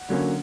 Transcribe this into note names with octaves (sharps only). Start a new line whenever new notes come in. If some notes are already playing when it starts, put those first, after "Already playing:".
Already playing: F#5
D3 F#3 A#3 C#4